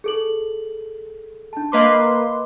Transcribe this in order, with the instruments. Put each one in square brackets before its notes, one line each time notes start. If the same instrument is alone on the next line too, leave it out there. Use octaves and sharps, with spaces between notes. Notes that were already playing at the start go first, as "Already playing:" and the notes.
[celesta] G#4 A4 F#7
D4 A5
[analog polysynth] A#3 B4 C6 [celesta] D#5 D6